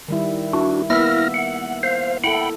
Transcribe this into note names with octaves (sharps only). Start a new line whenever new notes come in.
D#3 G3 E4
D4 E4 F#4
A#3 B3 E4 E5 F6 A#6
F#5
C5 F5
E4 A4 F#5 G5 B5